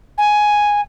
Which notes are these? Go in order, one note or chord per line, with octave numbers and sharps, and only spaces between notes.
G#5